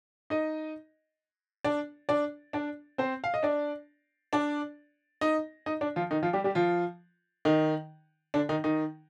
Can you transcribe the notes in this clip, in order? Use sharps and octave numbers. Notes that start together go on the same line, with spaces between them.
D#4 D#5
D4 D5
D4 D5
D4 D5
C4 C5
F5
D#5
D4 D5
D4 D5
D#4 D#5
D#4 D#5
D4 D5
F3 F4
D#3 D#4
F3 F4
G3 G4
G3 G4
F3 F4
D#3 D#4
D3 D4
D#3 D#4
D#3 D#4